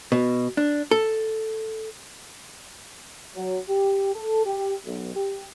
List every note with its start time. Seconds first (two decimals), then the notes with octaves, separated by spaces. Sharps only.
0.12 B2
0.57 D4
0.91 A4
3.36 F#3
3.68 G4
4.14 A4
4.45 G4
4.85 B1
5.14 G4